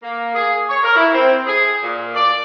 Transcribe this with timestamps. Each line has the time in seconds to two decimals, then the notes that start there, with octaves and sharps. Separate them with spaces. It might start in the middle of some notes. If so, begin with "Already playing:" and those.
0.02 A#3
0.34 G#4
0.68 C#5
0.83 A#4
0.95 E4
1.13 C4
1.46 G#4
1.82 A#2
2.15 D5